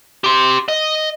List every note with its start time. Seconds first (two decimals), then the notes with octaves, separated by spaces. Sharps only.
0.24 G4 C6
0.68 D#5